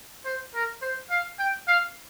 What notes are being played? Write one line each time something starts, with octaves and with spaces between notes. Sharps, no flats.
C5
A#4
C5
F5
G5
F5